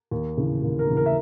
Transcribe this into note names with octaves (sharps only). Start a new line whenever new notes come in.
D#2
C#3 E3
D#2
A#4
C#3 E3
A#4
E5